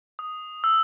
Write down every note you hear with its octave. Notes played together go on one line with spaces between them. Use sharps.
D#6
E6